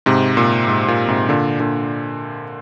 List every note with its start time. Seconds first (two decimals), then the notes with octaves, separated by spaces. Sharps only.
0.06 G#2 C3
0.37 A#2
0.68 G#2
0.88 A#2
1.08 G#2 C3
1.29 A#2 D3
1.60 A#2 D3